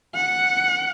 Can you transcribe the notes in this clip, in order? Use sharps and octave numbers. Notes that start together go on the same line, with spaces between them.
F#5